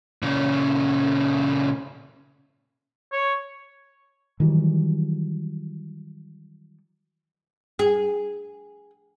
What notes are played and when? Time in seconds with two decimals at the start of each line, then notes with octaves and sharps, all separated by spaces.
0.22 A#2 C#3
3.12 C#5
4.40 D#3 E3 F#3 G3
7.79 G#4